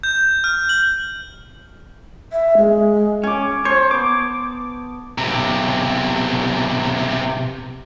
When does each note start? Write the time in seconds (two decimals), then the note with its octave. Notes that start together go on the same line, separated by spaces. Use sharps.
0.03 G6
0.44 F6
0.69 F#7
2.32 E5
2.57 G#3
3.23 C#4 G#5 D6
3.65 C5 C#5 A5
3.91 B3 D6
5.18 B1 C3